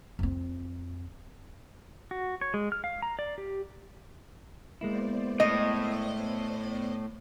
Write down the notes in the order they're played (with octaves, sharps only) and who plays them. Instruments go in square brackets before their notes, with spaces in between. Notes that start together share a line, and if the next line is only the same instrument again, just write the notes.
[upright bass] F2 C4
[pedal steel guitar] F#4
C#5
G#3
F6
F5
A#5
D5
G4
[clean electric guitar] G#3 A#3 E4 [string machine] B3 C5 D5
[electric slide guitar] A2 [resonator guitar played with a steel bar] D#5